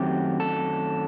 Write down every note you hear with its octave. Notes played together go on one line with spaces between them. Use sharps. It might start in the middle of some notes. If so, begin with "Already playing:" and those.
Already playing: F#2 D#3 F#3 A3 C4 G4
A4